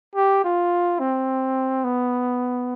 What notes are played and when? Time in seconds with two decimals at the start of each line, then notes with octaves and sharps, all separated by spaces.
0.16 G4
0.44 F4
1.00 C4
1.84 B3